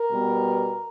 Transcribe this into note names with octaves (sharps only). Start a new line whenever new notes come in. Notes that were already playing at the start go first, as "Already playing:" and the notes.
Already playing: A#4
B2 G3 B3